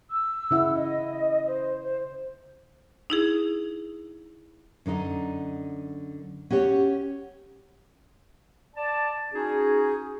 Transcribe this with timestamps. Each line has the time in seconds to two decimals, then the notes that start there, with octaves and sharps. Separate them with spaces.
0.11 E6
0.51 C#3 E4 F#5
0.75 D#5
1.47 C5
1.82 C5
3.10 D#4 E4 G#4
4.86 F#2 D3 D#4 D#5
6.50 C#4 F#4 G4 C#5
8.75 D5 A5
9.33 C#4 D#4 F#4 G#4